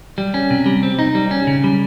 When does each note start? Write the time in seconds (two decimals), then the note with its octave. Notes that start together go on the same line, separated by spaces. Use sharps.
0.18 G3
0.34 C#4
0.50 C3
0.66 G3
0.83 C4
0.99 D#4
1.15 G3
1.31 C#4
1.47 C#3
1.64 G3